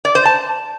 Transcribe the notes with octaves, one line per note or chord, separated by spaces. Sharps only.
D5
C5
A5